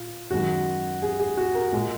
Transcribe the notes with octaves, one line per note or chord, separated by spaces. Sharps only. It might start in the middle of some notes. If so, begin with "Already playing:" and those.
Already playing: A#2 F4
F#2 D#3 G#3 F#4
G#4
G#4
F#4
A#4
A#2 G#3